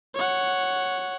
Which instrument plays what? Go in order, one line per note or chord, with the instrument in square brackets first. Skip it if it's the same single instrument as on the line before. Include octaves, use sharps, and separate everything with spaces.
[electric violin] C#5 F#5